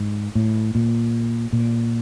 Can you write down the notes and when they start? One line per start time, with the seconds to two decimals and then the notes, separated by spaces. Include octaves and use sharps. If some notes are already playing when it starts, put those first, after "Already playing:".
Already playing: G#2
0.35 A2
0.75 A#2
1.53 A#2